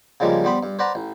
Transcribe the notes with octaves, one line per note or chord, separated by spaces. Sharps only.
C#3 F3 G3 G#3 A#3
G3 B3 C5 B5
G2
B4 C5 D5 F#5 A#5
A1